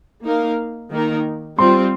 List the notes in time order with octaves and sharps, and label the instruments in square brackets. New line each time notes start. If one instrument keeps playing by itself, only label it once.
[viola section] A#3 D#4 A#4 F5
D#3 A#3 D#4 A#4
[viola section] G3 C4 F4 [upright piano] C6